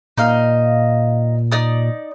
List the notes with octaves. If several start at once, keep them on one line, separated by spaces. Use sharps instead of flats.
A#2 D#4 D#5 F5
D#4 D5 D#6